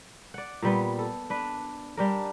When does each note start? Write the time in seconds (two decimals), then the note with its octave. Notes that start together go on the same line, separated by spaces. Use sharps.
0.34 D5 F#5
0.62 A#2 G3 B3
0.99 A4
1.30 D4 B4
1.97 G3 D4 A#4